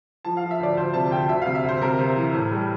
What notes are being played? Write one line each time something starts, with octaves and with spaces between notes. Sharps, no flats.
F3 A5
F5
F3
E5
D2 D5
D2 C5
C3 A5
D2 G5
D2 E5
F5
C3
E5
D2
C5
C3 A#4
C3
E3
A2
G3